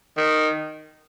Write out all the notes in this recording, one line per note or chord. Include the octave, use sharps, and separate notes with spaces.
D#3